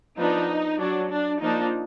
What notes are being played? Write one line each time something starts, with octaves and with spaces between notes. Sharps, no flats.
F3 B3 D4 D#4
F#3 D4
D4
F3 A#3 D4 D#4